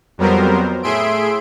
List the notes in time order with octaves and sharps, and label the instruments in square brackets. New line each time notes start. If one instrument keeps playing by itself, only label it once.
[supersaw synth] F2 F#3 G3 B3 A#4 C5
A2 G#4 E5 C6 D7